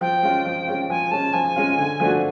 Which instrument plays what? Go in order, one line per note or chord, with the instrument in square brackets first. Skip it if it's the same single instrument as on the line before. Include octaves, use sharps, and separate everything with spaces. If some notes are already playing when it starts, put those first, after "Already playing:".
[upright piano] F3 [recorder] G5
[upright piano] G#3 C#4 F4
F3
G#3 C#4 F4
[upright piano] F3 [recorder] G#5
[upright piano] G#3 C#4 F4 [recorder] A5
[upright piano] F3 [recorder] G#5
[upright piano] G#3 C#4 F4
D3
F3 A3 D4 F#4